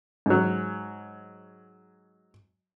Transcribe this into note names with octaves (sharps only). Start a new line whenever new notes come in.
G#2 F#3